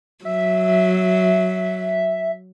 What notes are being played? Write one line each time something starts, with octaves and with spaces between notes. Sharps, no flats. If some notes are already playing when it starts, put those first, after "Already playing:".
F#3 E5